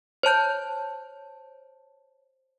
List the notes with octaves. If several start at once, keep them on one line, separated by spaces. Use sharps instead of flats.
C5 C#5 A5 G6